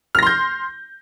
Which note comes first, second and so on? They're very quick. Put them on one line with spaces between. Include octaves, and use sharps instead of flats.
F6 A#6 C6 G6